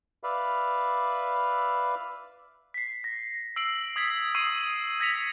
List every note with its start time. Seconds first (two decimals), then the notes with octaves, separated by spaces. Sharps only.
0.23 B4 D5 E5 F5
2.74 B6 C7
3.04 A#6
3.56 E6 C7 D7 F#7
3.96 D#6 G#6 B6 F#7
4.35 C#6 D#6 E6 C7 D7 D#7
5.00 G#6 A#6 B6 C#7 F7